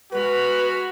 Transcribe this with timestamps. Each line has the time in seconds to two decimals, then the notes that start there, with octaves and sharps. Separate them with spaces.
0.12 G#3 F#4 B4 B5 F6